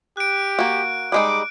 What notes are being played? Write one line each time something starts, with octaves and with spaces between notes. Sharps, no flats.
G4 F#6 D7
A#3 F#4
G3 G#3 D#4 D6